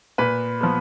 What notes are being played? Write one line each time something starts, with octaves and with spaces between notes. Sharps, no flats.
A#2 B4
F3 B3